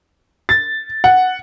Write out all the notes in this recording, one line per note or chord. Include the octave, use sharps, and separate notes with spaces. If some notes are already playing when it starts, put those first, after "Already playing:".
A6
F#5